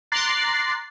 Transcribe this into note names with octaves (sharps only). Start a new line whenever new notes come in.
A#5 C6 D6 F#6 A6 C7